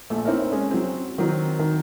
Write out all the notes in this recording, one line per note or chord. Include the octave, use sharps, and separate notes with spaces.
A#1 A3
C4 D#4 E4 A#4 C#5
G#3 C#4
F#3 C4
D#3 F#3 C4 D#4
D#3 A#5